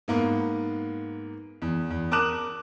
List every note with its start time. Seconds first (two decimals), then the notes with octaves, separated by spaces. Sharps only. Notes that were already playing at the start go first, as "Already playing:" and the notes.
0.08 G#2 A#3 B3
1.62 E2
1.91 E2
2.11 A#4 A5 D6 D#6 F#6 E7